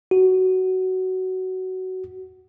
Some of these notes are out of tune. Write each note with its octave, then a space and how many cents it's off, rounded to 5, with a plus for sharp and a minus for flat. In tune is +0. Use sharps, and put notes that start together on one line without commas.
F#4 +15